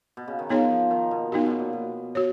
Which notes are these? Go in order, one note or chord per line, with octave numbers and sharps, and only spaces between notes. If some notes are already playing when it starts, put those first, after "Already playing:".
B2
C#3
D#3
F3 B3 D#4 G#4 C#5
F3
D#3
B2
C#3 B3 D#4 F#4
B2
A#2
B2
F#4 C#5